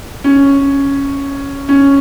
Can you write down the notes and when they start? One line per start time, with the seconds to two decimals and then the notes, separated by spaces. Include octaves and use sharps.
0.24 C#4
1.69 C#4